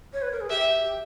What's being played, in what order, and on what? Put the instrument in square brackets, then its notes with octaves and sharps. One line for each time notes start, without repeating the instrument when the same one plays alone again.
[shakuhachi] C#5
B4
A#4
G#4
[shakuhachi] G4 [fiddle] E5
[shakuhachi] G4